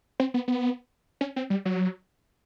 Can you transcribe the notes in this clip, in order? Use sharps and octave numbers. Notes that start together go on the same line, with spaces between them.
C4
B3
B3
C#4
C4
G3
F#3